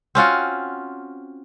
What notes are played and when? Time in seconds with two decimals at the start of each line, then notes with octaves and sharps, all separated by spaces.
0.15 C4 C#4 F4 F#4